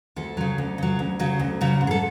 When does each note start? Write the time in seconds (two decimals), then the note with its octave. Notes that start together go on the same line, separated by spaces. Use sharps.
0.16 D2 A4
0.37 C#3 F#3
0.58 D2
0.78 C#3 F#3
0.99 D2
1.19 C#3 F#3
1.39 D2
1.61 C#3 F#3
1.81 G#2
1.87 G#4
1.91 A4